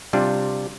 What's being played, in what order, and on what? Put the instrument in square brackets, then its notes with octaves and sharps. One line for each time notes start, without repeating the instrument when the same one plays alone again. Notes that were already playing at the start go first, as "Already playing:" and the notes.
[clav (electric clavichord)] C3 G3 D4 F4